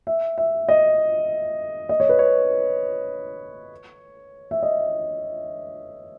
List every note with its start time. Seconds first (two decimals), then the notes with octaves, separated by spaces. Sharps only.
0.07 E5
0.38 E5
0.69 D#5
1.89 D#5
2.00 C#5
2.09 B4
2.19 C#5
4.51 E5
4.63 D#5